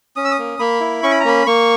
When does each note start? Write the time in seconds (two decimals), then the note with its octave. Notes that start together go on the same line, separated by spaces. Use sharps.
0.16 C#4 D#6
0.25 E6
0.32 D#6
0.39 A#3
0.59 A#3 B5
0.81 E4
1.03 C#4 C#6
1.11 B5
1.20 A#5
1.25 A#3 B5
1.47 A#3 C#6